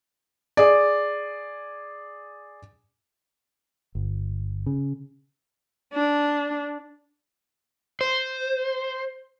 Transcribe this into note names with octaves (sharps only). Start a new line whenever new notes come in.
G#4 D5
G1
C#3
D4
C5